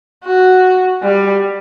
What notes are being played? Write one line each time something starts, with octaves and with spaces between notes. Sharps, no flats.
F#4
G3